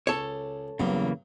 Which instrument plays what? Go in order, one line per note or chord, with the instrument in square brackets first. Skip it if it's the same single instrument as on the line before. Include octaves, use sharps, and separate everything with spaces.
[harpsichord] C#2 [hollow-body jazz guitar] A4 C#5
[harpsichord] E2 G2 F#3 [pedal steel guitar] C#3 E3 A#3